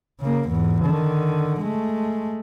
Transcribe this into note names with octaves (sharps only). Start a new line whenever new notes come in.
C#3 A#3
E2 G#2
D3 D#3
G#3 A3